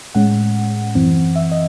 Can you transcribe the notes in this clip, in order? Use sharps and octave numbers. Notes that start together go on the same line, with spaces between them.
A2 G#3 C#4 F#5
F#2 E3 C4
E5
D#5